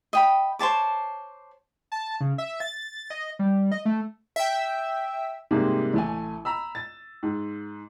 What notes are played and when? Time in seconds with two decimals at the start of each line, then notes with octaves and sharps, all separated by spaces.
0.13 D#5 G5 B5
0.59 C5 C#5 A5 D6
1.92 A5
2.20 C#3
2.38 E5
2.60 A6
3.10 D#5
3.39 G3
3.72 D#5
3.85 A3
4.36 E5 G5
5.51 G#2 C3 G3 G#3 A#3
5.94 A1 A3 G#5
6.45 A#5 B5 E6
6.75 A6
7.23 G#2